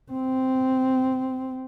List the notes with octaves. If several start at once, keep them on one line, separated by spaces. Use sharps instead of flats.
C4